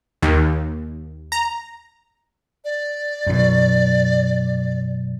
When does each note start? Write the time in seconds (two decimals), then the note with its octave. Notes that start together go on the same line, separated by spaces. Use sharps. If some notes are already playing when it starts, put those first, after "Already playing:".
0.22 D#2
1.32 A#5
2.65 D5
3.27 F#2 B2